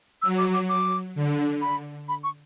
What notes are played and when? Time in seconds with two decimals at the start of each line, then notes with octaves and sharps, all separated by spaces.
0.22 F#3 E6
0.38 D6
0.54 D6
0.69 D6
1.15 D3
1.62 B5
2.09 B5
2.24 C#6